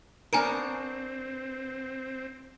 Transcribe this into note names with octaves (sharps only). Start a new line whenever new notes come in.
B3 C4 D4 A#4 C#5 G#5 A#5 D7